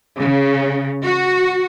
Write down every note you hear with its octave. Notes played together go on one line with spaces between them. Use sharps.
C#3
F#4